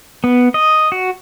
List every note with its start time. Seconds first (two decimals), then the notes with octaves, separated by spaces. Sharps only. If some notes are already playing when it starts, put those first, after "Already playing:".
0.24 B3
0.54 D#5
0.92 F#4